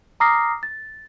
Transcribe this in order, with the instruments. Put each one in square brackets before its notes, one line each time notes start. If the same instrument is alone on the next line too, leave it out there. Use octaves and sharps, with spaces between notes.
[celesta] A#5 D6 D#6 F6 A#6 C7
A6